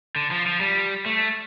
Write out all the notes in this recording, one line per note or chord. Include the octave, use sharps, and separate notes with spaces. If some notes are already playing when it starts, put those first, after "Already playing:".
D3
F3
F3
G3
A3